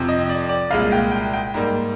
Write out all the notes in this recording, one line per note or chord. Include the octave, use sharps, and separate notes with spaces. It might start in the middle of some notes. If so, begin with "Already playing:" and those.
Already playing: F2 C3 F3
D#5
D5
D5
C2 A#2 G#3 F5
G5
G5
G5
G#2 G3 A#3